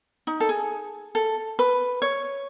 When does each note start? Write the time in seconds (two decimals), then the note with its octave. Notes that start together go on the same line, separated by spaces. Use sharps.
0.27 D#4
0.40 A4
0.49 G#4
1.15 A4
1.59 B4
2.02 C#5